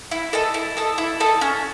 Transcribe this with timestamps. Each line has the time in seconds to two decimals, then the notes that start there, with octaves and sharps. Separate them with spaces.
0.11 E4
0.33 A4 D#5 A5
0.54 E4
0.77 A4 D#5 A5
0.98 E4
1.20 A4 D#5 A5
1.41 C#4